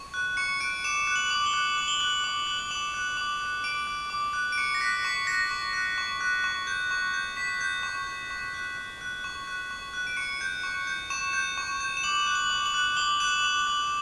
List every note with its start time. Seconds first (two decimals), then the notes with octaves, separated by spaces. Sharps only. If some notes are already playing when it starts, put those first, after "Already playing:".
Already playing: C#6
0.14 F#6
0.37 C#6 C#7
0.60 F#6 D7
0.84 D6 E7
1.07 F#6
1.16 F#7
1.31 D6
1.46 G7
1.54 F#6
1.77 D6 F#7
1.88 G7
1.99 F#6 F#7
2.24 D6
2.47 F#6
2.59 F#7
2.71 D6 E7
2.94 F#6
3.17 D6
3.41 F#6
3.64 D6 D7
3.87 F#6
4.10 D6
4.33 F#6
4.52 D7
4.58 C#6 C#7
4.75 A#6
4.81 F#6 B6
4.93 A#6
5.04 C#6 B6
5.27 F#6 A#6
5.51 C#6
5.73 F#6
5.98 C#6
6.21 F#6
6.44 C#6
6.67 G6
6.91 C#6
7.14 G6
7.37 C#6 B6
7.61 G6
7.83 C#6
8.07 G6
8.31 C#6
8.54 F#6
8.77 C#6
9.01 F#6
9.24 C#6
9.47 F#6
9.71 C#6
9.94 F#6
10.07 D7
10.17 C#6 C#7
10.41 G6
10.63 C#6
10.87 G6
11.10 C#6 E7
11.33 G6
11.58 C#6
11.81 G6
11.97 E7
12.04 D6 F#7
12.27 F#6
12.35 F#7
12.50 D6
12.66 F#7
12.74 F#6
12.97 D6 G7
13.20 F#6 E7
13.28 F#7
13.44 D6
13.59 F#7
13.67 F#6